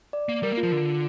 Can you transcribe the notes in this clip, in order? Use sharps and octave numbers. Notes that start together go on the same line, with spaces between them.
D5
A#3
G3 A#4
A#3
F4
F3
D3